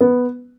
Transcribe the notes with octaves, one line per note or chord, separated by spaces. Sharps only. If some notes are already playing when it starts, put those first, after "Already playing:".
B3